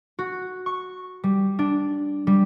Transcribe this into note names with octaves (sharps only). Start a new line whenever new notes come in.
F#4
C#6
G3
D4
G3